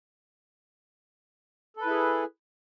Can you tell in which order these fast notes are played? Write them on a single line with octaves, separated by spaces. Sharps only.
A4 B4 E4 G#4